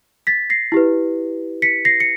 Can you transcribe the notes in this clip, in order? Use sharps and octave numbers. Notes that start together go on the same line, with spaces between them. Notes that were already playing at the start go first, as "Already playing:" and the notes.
A6 B6
A#6 C7
E4 G4 B4
B6 C#7
A#6 C7
C#7